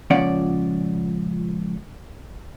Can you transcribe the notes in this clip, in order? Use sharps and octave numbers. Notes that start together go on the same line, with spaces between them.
C#2 A#2 F3 C#4 D5 F#5